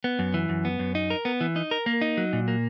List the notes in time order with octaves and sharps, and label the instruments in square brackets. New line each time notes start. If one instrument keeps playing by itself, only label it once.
[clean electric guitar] B3
F#2
E3
F#2
B3
F#2
D#4
A#4
B3
E3
D#4
A#4
A#3
D#4
F#3
A#2
A#3